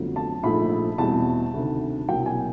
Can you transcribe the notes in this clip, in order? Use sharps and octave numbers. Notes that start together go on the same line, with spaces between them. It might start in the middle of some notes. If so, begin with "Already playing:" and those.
Already playing: G1 F2 D3 F#3 A3
A5
A#1 G#2 F3 A3 B5
E2 B2 G3 C4 A5
D2 C3 D#3
C2 B2 F#3 A#3 G5
G#5